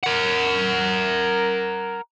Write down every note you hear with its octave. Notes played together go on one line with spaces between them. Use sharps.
A#4 F#5